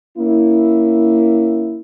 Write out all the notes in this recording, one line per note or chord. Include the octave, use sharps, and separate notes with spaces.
A#3 C#4 E4